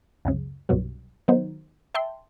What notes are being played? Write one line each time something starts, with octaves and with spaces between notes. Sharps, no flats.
C#2 F#2 C#3
C2 G2 B2 F#3
D#3 F#3 B3 D#4 C5
E5 G5 A5 C6